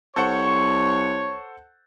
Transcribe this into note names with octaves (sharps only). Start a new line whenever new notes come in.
C2 A4 C5 C#5 F#5 C#6